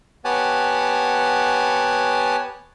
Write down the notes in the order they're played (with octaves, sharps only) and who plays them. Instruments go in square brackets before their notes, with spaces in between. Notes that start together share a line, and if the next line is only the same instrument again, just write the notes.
[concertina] B3 G4 C#5 F#5 G#5 A5